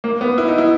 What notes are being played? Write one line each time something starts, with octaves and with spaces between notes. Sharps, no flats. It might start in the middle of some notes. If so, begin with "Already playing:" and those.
A#3
B3
E4
D#4
E4